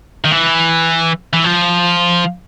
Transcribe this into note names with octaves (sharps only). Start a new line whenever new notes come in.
D#3
E3
E3
F3